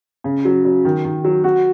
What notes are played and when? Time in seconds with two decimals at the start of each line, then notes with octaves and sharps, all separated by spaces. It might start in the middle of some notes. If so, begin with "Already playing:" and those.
0.24 C#3
0.45 F#3
0.65 F#3
0.85 D#3
1.05 D#3
1.24 F#3
1.44 F#4